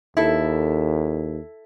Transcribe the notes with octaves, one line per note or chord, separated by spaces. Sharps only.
D#2 E4 A4